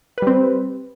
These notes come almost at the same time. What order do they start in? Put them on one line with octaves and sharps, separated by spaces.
B4 G3 C4